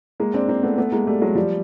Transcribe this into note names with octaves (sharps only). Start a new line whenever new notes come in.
G#3 A#3
C4 D4
A#3 C4
A3 B3
A3 B3
G#3 A#3
G3 A3
F#3 G#3
F3 G3